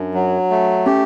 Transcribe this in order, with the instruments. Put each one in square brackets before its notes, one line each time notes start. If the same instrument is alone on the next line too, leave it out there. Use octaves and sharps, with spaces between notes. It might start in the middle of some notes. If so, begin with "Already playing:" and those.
Already playing: [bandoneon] F#2 [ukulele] D4
[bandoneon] F#3
A3
[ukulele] C#4 [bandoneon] G4